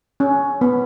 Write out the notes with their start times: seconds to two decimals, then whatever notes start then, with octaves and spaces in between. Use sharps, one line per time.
0.20 C#4
0.61 B3